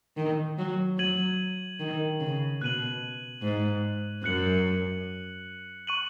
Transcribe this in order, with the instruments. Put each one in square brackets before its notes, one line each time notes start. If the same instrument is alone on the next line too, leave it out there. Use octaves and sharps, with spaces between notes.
[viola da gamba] D#3
F#3
[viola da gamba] F#3 [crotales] G#6 D#7 F#7
[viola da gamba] D#3
C#3
[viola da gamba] B2 [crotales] F#6 D#7 F#7
[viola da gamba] G#2
[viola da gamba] F#2 [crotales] F#6 C#7 F#7
[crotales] C#6 F#6 D#7 F#7